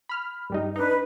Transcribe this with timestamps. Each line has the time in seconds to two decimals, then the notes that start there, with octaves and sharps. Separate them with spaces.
0.09 B5 F6
0.50 G2 G3 D#4
0.76 D4 D#4 B4